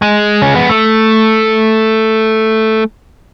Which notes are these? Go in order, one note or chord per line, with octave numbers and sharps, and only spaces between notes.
G#3
C#4
B3
A3